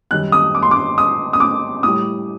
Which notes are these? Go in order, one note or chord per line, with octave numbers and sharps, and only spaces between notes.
F#2 D#3 G3 F#6
D#6
D6
C6
D6
D#6
D#6
D6
A2 G3 D#6